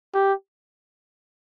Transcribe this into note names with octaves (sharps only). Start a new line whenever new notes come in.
G4